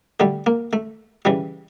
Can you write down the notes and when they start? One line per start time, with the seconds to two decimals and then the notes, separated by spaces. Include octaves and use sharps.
0.20 D3 G3 A3
0.46 A#3
0.73 A3
1.25 C#3 E3 G3